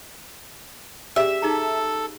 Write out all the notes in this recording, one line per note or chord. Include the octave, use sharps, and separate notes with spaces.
C#4 G4 G#4 E5
D#4 G#4 A4 A#5